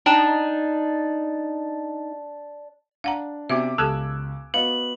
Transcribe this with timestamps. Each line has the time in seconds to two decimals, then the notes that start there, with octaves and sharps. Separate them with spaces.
0.06 D4 D#4 G5 A#5 E7
3.04 D4 F5 F#5 A#5
3.49 C3 B3 F#4 E5 D6
3.78 C#2 G4 A4 A5 E6 F#6 G#6
4.54 B3 F#4 D#5 F5 F#7